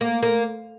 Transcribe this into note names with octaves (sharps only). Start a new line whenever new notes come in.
A#3
A#3